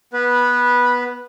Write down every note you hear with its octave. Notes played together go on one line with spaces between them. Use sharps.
B3 B4